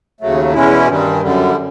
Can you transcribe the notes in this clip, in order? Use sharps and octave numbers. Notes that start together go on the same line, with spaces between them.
D#2 C#3 F#3 A3
E2 B2 G#3 C#4 E4
G2 D#3 G3
F#2 D3 G3